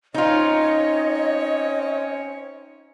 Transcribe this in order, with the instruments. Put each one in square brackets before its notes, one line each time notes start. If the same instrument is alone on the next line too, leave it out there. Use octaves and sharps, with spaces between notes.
[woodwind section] C4 C#4 C#5 [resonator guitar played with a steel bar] D#4 F4 [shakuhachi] D#5